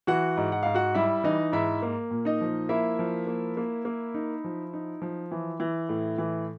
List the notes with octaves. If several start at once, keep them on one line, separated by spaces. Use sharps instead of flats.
E3 F#4 F#5
G#2
F#5
G#2 F5
F#4 F#5
G3 E4 E5
E3 D#4 D#5
G#2 E4 E5
A#3
A#2
D#4 D#5
F3
A#3 E4 E5
F3
A#3
A#3
A#3
D#4
F3
D#4
F3
E3
E3
A2
E3